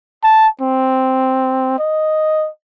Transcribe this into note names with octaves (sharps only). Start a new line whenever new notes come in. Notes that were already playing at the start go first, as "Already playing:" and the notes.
A5
C4
D#5